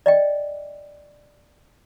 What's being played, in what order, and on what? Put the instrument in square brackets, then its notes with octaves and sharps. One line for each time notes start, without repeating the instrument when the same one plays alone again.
[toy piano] D5 D#5 G5